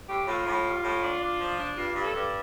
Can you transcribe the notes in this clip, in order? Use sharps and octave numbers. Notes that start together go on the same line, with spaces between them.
A2 G4
A2 F4
A2
G3
A2
D4
D4
F3
D4
G2 F4
G2
A4
G2